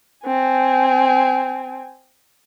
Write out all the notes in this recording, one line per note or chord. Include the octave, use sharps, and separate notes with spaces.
C4 G#5